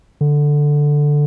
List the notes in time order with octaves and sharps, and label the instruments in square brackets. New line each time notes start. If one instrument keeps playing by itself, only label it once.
[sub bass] D3